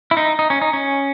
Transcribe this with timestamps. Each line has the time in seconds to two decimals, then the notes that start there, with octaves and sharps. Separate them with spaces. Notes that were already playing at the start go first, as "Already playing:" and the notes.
0.11 E4
0.17 D#4
0.39 D#4
0.50 C#4
0.62 D#4
0.73 C#4